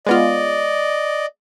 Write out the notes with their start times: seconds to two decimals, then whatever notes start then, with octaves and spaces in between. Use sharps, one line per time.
0.07 G#3 B3 F4 D5 D#5